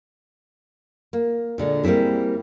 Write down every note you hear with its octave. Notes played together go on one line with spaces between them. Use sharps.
A#3
A#2 D3 G#3
G3 A#3 C4 E4 G#4